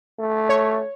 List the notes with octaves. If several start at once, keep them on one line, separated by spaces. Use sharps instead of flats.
A3
C#5